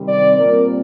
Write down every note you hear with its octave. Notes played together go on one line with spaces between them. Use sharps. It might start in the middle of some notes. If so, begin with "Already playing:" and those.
Already playing: C3 D#3 G3 C4
D5
A#2 G3 C4 A#4